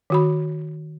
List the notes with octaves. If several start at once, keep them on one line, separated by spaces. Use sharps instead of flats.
D#3 F#4 B5